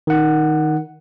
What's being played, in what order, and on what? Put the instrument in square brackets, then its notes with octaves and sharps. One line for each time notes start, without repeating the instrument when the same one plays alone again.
[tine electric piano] D#3 F#5